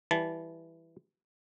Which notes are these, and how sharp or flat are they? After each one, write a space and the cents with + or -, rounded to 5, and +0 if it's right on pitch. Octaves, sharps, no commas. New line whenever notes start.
E3 +0 G3 +0 A5 -20